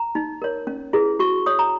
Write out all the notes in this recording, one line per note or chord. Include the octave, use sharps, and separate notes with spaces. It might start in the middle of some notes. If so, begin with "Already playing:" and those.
Already playing: A#5
D#4
A#4 C#5
C#4
E4 G#4 B4
F#4 C#6
C#5 D#6
A#5